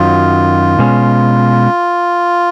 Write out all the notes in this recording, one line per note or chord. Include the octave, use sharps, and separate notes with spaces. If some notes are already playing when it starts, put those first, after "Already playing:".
Already playing: F#2 D#3 F#3 F4
B2 G#3 C#4